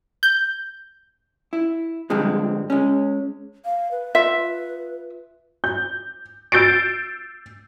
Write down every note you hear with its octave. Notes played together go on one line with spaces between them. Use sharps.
G6
E4
G2 D3 F3 G3 G#3 C4
G#3 C#4
F5
B4
F4 E5
G6
E6 G6 A6 C7 D7